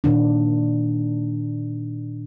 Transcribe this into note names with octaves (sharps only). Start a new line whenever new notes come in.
A#2 D#3 D4